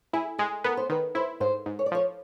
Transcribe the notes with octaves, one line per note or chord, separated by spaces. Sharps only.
E4 G#4
G#3 G#4
B3 A#4
C5
D#3 B4
E4 C5
G#2 C5
G#2
C#5
D5
F3 C#5